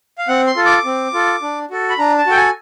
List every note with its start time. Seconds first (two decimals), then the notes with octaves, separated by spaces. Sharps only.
0.18 F5
0.28 C4 F#5
0.47 C6
0.56 F4 A4
0.66 D6
0.85 C4
1.13 F4 A4
1.42 D4
1.71 F#4 A4
1.90 B5
1.99 D4 A#5
2.18 A5
2.27 F#4 A4 G5
2.37 G#5